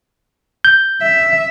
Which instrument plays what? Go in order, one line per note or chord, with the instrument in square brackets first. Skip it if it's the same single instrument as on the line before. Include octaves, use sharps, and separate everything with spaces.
[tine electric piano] G6
[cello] E5